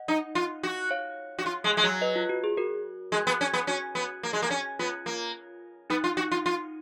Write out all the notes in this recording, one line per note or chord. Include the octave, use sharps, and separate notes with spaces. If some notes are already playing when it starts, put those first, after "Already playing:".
Already playing: D#5 F#5
D#4
F4
F#4
C#5 F5
F#4
F4
G#3
G#3
F#3
B4 D#5
F4
F#4
G#4
F#4 A#4
G#3
B3
C#4
B3
C#4 F#4
B3
A#3
G#3
A#3
C#4
B3 F4
A#3
B3 D#4
F4
F#4
F4
F4